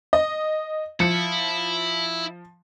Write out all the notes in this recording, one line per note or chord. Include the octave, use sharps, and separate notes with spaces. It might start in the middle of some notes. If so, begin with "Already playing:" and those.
D#5
F3 E4 C#7